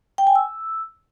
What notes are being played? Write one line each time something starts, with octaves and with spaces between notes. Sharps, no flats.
G5
G#5
E6